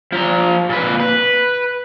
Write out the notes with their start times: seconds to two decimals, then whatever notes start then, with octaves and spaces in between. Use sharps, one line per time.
0.12 F3 A#5
0.70 A#2 B4
1.00 B4